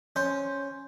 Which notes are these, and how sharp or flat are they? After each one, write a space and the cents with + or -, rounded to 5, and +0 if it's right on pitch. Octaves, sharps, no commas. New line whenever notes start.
C#4 +0 C5 +0